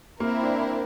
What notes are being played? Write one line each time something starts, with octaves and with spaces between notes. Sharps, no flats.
A#3 C4 E4 A#4
D4